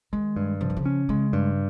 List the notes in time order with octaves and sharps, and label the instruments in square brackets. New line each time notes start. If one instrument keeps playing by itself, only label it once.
[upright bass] D#3 [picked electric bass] G#3
[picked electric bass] G2
[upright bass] C#3 [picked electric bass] F3
[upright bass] D#3
C#3
[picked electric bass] C#4
[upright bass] C#3 [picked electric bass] G#3
[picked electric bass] G2